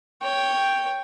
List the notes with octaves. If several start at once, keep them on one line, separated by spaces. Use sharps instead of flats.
C#5 G5